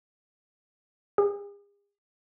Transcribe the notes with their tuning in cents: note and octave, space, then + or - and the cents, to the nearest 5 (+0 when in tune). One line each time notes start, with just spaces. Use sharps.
G#4 -45